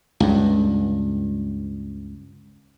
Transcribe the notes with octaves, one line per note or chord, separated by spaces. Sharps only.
C#2 G2